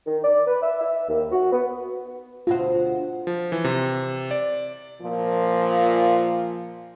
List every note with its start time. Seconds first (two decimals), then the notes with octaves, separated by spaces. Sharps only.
0.06 D#3
0.23 D5
0.47 B4
0.62 E5
0.81 E5
1.09 D#2
1.32 F#4
1.52 B3
2.47 D2 B2 F4 C5 F#5
3.27 F3
3.52 E3
3.64 C3
4.31 D5
5.01 A#2 F3